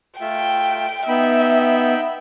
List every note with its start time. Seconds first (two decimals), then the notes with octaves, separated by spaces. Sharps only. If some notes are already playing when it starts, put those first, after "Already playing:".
0.21 A3 F4 E5 G5
1.08 B3 D#4 E5 G5 B5